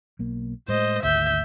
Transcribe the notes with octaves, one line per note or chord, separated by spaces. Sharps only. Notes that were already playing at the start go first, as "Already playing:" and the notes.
B1 A#3
A2 G#3 C5 D#5
G#1 D2 E5 G6